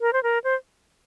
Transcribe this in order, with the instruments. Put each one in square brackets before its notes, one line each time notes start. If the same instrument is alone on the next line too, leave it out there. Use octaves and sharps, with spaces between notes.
[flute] A#4
C5
A#4
C5